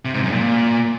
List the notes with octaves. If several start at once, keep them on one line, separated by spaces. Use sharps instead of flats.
C3
G#2
F#2
A#2